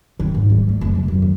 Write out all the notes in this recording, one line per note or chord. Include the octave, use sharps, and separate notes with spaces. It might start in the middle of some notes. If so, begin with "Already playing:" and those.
D#3
G#2
G3
A3
F#1
C#3
F#2
D#2